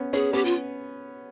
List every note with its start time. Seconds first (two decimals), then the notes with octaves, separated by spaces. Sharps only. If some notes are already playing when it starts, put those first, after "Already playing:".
Already playing: B3 C#4
0.13 B3 C#4 G#4
0.33 B3 C#4 G4
0.45 F4